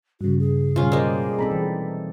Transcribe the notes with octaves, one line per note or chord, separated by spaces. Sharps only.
G2 C#3 F#4
G#4
B2 G3 C#4 F4
G#3 A#3 C5 D5 D#5
C4 D#4 A4 A#5 B5
E3